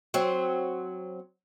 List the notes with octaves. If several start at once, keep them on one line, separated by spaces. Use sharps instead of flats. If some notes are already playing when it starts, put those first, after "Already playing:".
F#3 C4